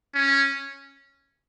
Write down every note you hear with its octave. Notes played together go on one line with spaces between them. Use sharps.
C#4